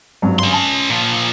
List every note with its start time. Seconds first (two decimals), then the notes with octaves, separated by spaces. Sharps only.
0.22 G#1 G2 F#3
0.39 C#4 C6
0.53 A5
0.89 A#2 F3